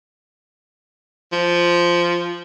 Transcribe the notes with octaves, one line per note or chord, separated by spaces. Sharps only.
F3